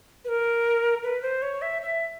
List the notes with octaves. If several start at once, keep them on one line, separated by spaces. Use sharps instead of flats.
B4
A#4
B4
C5
C#5
E5
E5